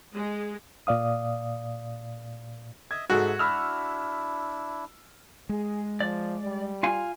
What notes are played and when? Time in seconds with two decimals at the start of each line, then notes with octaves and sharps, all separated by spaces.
0.13 G#3
0.87 A#2 D5 F5 D#6
2.91 D#5 E5 G#6
3.10 G#2 G#3 F#4 A4 E5
3.39 D4 E4 B5 E6 F6
5.49 G#3 G#4
6.00 F3 D5
6.45 G3
6.83 F4 F5 G#5